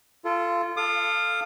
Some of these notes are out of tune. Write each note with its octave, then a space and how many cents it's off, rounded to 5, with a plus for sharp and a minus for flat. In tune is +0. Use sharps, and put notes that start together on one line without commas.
F4 -20 A4 +0
A4 +5 F5 +0 D#6 -40